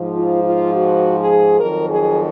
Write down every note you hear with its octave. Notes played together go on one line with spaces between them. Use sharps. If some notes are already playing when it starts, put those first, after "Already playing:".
Already playing: G#2 F3
F4
F4
F#4
G#4
F2 D#3 F#3 A#4
G#4